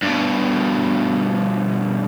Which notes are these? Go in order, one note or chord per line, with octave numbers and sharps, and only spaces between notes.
G2 B2